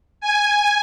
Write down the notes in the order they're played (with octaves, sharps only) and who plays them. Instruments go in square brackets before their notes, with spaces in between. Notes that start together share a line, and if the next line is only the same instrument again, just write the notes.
[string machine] G#5